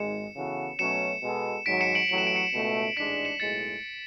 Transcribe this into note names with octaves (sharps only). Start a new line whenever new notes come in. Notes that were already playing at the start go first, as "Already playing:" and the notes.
Already playing: G#1 G#2 G#3 C#7 E7
C#3 E3 B3 F#4 A4
B2 F#3 A3 C#4 C#7 E7
B2 G#3 B3 F#4 A4
G#1 G#2 F#3 B6 D7
C#7 E7
D7 F#7
A1 A2 F#3 F#7
E7
D7
C#7 E7
C#2 B2 A3
A1 G#2 G#3 D4 B6 D7
C#7 E7
B1 A2 G#3 A6 C#7